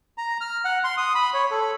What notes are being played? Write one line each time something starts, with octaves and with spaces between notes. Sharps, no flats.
A#5
F6
F#5
C6
D#6
B5
C#5
A4